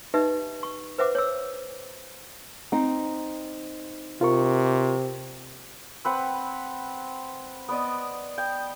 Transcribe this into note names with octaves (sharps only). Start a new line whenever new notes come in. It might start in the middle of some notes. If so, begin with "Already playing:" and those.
D#4 G4 B4 D#5 E5
C#6
B4 C5 E5 F#5 D6
C#5 E6
C4 D#4
C3 F4 A#4 C#6
C4 B4 F#5
B3 D5 D#5
G5